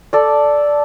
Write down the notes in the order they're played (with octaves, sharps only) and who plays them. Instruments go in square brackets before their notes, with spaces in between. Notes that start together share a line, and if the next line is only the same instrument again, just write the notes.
[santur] A4 D5